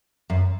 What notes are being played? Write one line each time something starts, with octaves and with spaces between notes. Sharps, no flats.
F#2